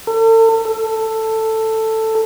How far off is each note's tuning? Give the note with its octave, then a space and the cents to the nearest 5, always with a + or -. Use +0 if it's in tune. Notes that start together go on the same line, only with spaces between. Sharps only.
A4 +40
A4 +10